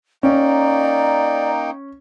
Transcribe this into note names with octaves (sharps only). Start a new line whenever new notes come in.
A#3 C#4 D#4 D5 G5